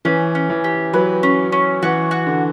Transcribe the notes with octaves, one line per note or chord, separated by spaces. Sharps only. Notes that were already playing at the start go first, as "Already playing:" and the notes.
E3 C#4
C#4
E3
G4
F#3 B4
C#4
C#4
E3 F#4
F#4
D3